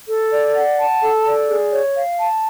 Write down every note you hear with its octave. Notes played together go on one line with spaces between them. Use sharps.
A4
D5
F#5
A5
A4
D5
G#4
C#5
F5
A5